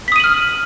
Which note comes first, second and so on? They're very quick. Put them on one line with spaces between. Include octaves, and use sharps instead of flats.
B6 D#6 D#7 F#7 F6